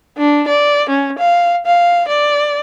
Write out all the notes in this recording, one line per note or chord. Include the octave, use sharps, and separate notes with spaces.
D4
D5
C#4
F5
F5
D5